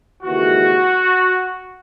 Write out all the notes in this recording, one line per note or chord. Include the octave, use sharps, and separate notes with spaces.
D#2 C#3 E3 G#3 F#4